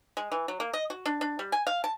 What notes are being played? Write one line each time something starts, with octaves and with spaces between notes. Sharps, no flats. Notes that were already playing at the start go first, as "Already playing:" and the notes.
G#3
E3
F#3
A#3
D#5
F#4
D4
D4
G3
G#5
F5
A5